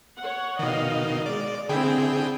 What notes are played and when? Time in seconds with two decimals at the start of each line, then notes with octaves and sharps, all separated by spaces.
0.18 C#5 F#5
0.59 B2 D#3 D#5 F5
1.26 G#3 D5
1.69 D3 C4 E4 G#4 G5